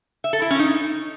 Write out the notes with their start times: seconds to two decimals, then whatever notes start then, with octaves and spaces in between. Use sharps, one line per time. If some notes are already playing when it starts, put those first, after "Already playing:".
0.24 E5
0.33 A4
0.42 E4
0.50 C#4
0.59 D#4